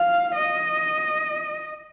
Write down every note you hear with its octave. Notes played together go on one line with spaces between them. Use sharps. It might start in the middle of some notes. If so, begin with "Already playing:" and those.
Already playing: F5
D#5